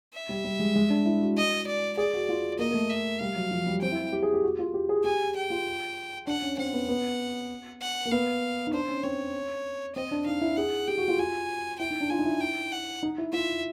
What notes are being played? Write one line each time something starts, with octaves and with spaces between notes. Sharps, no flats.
E5
G3
G3
G#3
G#3
D4
E4
F#4
D#5
D5
G#4 D5
F#4
F4
A#3 D#5
A#3
A3
E5
G3 F5
F#3
F3
G3
C4 G5
E4
G4
G#4
G4
F#4
F4
G4
G#4
G4 G#5
G5
F4
D4 F#5
C#4
C4 F#5
B3
B3
F#5
A#3
B3 F5
D#4
D4 C5
C#4
C4 C#5
C4 D#5
D4
D#4 F5
E4
G#4 F#5
G4 G5
F#4
F4
F4 G#5
E4 G5
D#4
D4
F4 G#5
D#4
E4
G5
F#5
D#4
E4
F4 E5